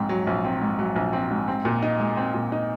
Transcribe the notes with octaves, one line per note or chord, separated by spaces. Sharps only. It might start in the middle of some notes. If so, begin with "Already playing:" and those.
Already playing: A#1 G#2 C4
F#3
A#1
C4
G#2
F#3
A#1
C4
G#2
C4
A#2
D#4
G#3
C4
A#2
D#4